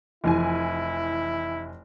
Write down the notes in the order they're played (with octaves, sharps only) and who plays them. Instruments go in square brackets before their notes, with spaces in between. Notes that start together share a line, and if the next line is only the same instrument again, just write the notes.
[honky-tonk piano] F1 E3 G#5 [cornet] E4